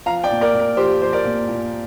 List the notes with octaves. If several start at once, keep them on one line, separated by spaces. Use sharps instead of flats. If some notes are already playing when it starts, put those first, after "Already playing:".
F3 F5 A#5
D5 G5
A#2
A#4 D5
A#2
A#4
F3 G4 C5
F3 C5
A#4 D5
A#2
A#2